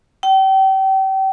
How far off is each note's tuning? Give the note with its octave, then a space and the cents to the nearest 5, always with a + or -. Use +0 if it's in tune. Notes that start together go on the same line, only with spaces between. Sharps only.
G5 -35